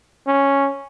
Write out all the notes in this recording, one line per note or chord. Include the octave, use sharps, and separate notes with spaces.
C#4